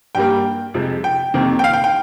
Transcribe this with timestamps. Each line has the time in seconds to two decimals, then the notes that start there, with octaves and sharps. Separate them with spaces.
0.15 G2 G3 A#3 G5
0.74 F2 C3 F3 G#3
1.04 G5
1.34 F2 C3 D#3 A#3
1.59 G5
1.64 F5
1.74 G5
1.84 G5